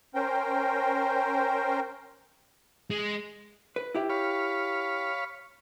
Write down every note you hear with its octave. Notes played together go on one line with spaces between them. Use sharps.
C#4 A#4 C5 G5
G#3
B4
E4 G4 E5
C#5 F5 B5